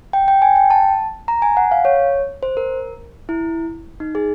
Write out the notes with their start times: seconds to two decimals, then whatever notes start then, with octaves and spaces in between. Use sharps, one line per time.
0.13 G5
0.28 G5
0.42 G#5
0.56 G5
0.70 A5
1.28 A#5
1.42 G#5
1.57 F#5
1.71 F5
1.85 C#5
2.43 C5
2.57 A#4
3.29 E4
4.00 D#4
4.15 G#4